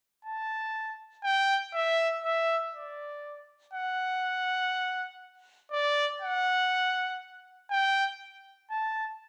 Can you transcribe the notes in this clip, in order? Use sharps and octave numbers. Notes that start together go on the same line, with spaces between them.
A5
G5
E5
E5
D5
F#5
D5
F#5
G5
A5